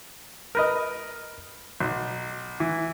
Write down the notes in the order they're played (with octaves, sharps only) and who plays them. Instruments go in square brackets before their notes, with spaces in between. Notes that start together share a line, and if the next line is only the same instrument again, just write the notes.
[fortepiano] A#4 B4 D#5
B1
E3